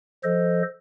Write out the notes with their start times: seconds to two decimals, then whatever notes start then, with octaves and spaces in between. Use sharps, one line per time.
0.24 F3 A4 C5 D#5